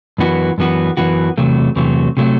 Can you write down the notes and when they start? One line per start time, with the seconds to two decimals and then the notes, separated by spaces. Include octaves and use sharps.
0.18 F#2 E3 B3 F#4
0.58 F#2 E3 B3 F#4
0.97 F#2 E3 B3 F#4
1.38 E2 C3 F#3 A3
1.76 E2 C3 F#3 A3
2.17 C3 F#3 A3